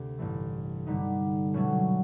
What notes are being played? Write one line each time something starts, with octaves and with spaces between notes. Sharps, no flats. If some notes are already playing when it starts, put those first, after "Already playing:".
Already playing: D2 C3
A1 G2 E3 A3
G2 D3 G3 B3 D#4
B2 F#3 A3 C#4 F#4